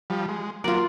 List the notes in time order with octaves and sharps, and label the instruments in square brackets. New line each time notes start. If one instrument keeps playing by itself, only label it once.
[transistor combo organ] F3 G3
G#3
[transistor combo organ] F#3 A#3 [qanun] F4 D5